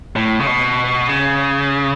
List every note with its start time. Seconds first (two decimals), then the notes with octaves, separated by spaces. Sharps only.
0.16 A2
0.40 C#3
0.47 B2
1.09 C#3